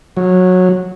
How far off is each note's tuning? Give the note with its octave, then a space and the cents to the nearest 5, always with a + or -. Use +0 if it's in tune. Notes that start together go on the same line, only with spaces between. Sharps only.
F#3 -15